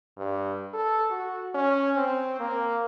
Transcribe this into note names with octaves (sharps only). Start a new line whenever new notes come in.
G2
A4
F#4
C#4
C4
A#3